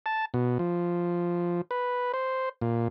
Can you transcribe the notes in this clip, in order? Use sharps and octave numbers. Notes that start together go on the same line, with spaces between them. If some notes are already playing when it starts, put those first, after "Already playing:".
A5
B2
F3
B4
C5
A#2